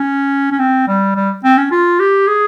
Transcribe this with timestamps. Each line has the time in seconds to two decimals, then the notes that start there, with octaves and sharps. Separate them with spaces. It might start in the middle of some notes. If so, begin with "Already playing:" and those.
Already playing: C#4
0.52 C#4
0.59 C4
0.88 G3
1.16 G3
1.44 C4
1.58 C#4
1.71 F4
2.00 G4
2.28 G#4